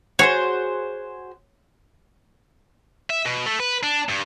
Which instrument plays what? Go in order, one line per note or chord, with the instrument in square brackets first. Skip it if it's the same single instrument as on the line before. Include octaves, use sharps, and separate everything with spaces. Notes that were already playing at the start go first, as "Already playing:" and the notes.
[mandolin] F#4 G#4 C5 [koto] C#5
[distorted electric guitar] E5
B2
A3
B4
D4
G2